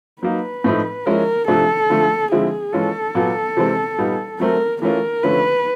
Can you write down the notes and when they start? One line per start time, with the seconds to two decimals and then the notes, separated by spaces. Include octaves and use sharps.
0.23 F#3 A#3 D#4 B4
0.64 A2 F3 A3 C4 D#4
1.06 F3 G#3 C#4 E4 A#4
1.48 C3 F3 A3 D4 A4
1.90 D3 F3 A3
2.31 D3 F3 G#3 C4 E4 G#4
2.73 E3 G#3 C#4 F4 A4
3.15 A#2 F#3 B3
3.57 C3 E3 G#3 C4
3.98 A#2 G3 B3 D#4
4.40 F#3 A3 C4 A#4
4.82 E3 A3 C#4 F4 A#4
5.23 D3 F3 A3 C#4 B4